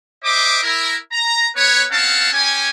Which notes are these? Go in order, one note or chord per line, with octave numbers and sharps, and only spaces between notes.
C5 D#5 E5 D6
E4 A#4
A#5
B3 B4 C#5
C4 C#4 F5 F#5 A5
C#4 G4 G#5